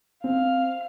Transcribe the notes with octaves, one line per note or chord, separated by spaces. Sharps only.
C4 F5